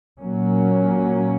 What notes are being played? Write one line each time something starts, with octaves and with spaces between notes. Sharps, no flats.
A#2 F#3 A#3 C#4